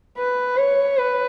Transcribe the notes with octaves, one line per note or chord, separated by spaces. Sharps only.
B4
C#5
B4